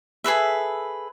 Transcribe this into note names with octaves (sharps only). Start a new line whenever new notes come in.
G#4 A4 B4 E5